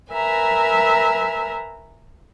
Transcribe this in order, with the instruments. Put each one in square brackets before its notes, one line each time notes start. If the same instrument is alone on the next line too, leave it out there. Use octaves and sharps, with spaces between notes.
[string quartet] A#4 B4 E5 G#5 A#5